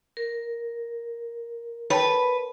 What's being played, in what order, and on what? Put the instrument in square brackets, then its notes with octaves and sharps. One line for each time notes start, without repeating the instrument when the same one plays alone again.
[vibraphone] A#4
[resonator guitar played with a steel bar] B4 [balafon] C#5 G5 A5